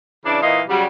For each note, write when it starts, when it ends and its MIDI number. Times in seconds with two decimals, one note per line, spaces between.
0.24 0.41 49
0.24 0.41 52
0.24 0.41 62
0.42 0.62 46
0.42 0.62 52
0.42 0.62 63
0.42 0.62 75
0.42 0.62 77
0.69 0.85 49
0.69 0.85 54
0.69 0.85 55